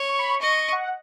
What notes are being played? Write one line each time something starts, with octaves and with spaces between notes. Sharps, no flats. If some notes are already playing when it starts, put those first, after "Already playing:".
Already playing: C#5
C#6
B5
C#6
D#5 C#6
C#6
F#5